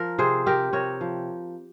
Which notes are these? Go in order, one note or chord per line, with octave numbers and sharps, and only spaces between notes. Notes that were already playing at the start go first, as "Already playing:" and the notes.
Already playing: F3 A#4
C3 G#4 C5
C4 G4 A#4
C3 A#4 C#5
F3